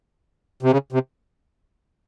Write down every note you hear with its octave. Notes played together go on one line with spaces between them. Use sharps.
C3
C#3
C3